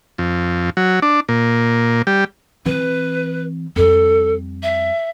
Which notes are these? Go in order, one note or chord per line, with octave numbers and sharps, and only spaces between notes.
F2
F#3
D4
A#2
G3
E3 C4 B4
F2 G3 A4
E5